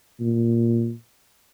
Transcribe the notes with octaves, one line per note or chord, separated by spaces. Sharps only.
A#2